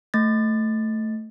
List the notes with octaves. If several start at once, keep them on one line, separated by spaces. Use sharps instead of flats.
A3 A6